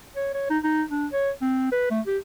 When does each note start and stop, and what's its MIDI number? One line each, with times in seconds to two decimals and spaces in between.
0.16 0.30 73
0.34 0.48 73
0.50 0.58 63
0.64 0.83 63
0.90 1.07 62
1.13 1.31 73
1.42 1.70 60
1.72 1.87 71
1.91 2.01 57
2.07 2.18 67